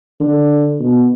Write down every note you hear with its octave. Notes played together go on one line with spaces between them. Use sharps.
D3
B2